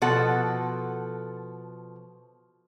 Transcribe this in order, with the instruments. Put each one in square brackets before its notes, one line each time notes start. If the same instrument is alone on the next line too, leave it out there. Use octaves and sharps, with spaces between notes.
[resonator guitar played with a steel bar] B2 F3 A4 F#5